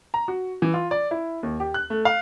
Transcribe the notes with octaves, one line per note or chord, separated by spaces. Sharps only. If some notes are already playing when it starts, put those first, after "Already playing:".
A#5
F#4
E3
F4
D5
E4
D#2
G4
F#6
A3
F5